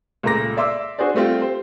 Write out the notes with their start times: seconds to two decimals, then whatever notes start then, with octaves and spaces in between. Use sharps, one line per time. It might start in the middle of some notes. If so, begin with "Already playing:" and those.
0.23 C#2 A#2 A3 A#5 D6 A#6
0.57 D5 E5 C6 D6 E6
0.99 D4 F#4 G#4 C5 D5
1.15 G3 A3 C4 F4 G4
1.42 C5